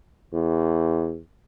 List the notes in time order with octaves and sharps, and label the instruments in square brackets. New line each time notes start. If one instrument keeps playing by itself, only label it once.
[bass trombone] E2